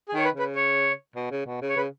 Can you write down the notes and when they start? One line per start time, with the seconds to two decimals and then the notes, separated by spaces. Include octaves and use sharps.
0.09 G#4
0.14 D#3 C#5
0.24 B4
0.35 C#3 B4
0.55 C#5
1.16 B2
1.31 C#3
1.47 B2
1.62 C#3
1.69 C#5
1.76 C#3 B4